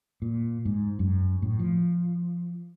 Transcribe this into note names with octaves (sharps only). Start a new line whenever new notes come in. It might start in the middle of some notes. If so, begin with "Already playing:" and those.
A#2
G#2
F#2
A2
F3